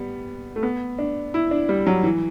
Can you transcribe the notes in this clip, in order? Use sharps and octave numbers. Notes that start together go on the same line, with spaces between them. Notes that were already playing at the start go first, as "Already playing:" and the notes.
Already playing: G3 B3
A3
B3
D4
E4
D4
G3
F#3
E3